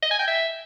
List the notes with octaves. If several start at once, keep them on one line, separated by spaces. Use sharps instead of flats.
D#5
G#5
G5
E5